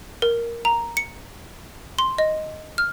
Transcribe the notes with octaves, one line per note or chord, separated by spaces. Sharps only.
A#4
A#5
C#7
C6
D#5
F6